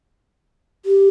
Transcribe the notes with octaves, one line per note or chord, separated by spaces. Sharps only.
G4